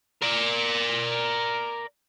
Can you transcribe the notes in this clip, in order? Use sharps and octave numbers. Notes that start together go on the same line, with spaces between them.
A#4 D5